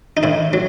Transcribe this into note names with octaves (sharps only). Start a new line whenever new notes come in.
D#4
A2 E4
F#3